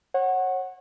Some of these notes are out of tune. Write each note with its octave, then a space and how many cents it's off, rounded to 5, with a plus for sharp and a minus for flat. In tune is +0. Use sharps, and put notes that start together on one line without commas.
C#5 -30 F#5 +0